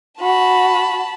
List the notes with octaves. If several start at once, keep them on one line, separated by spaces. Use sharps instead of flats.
F#4 A5 B5